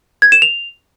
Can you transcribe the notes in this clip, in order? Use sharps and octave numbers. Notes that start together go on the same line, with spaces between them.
G#6
E7
F7